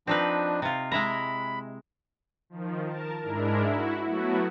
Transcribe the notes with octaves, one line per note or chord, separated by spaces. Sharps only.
F3 C4 D4 D#4 B4
C3 F4
G#3 E4 A#5 B5
D#3 F3
A#4 A5
G#2 G#3 D4 E4 A#4
E4 F#4
F#3 A3 B3 E4 F#4